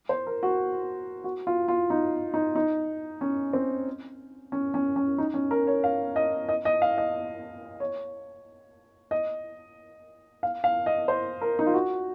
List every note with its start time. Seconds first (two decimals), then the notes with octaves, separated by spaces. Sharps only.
0.09 C5
0.27 A#4
0.43 F#4
1.24 F#4
1.47 F4
1.68 F4
1.90 D#4
2.34 D#4
2.56 D#4
3.21 C#4
3.53 C4
4.52 C#4
4.74 C#4
4.96 C#4
5.18 D#4
5.34 C#4
5.51 A#4
5.67 C#5
5.84 F5
6.16 D#5
6.49 D#5
6.65 D#5
6.82 F5
6.98 D#5
7.80 C#5
9.11 D#5
10.43 F5
10.64 F5
10.86 D#5
11.08 C5
11.41 A#4
11.59 D#4
11.67 F4
11.74 F#4